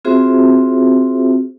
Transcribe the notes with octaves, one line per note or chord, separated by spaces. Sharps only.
C4 F4 F#4 G#4 C5 E5